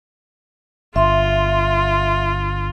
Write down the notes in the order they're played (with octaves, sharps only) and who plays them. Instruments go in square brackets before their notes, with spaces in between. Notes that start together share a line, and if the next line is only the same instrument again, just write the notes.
[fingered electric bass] G1 [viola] F4 [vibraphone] E5 C6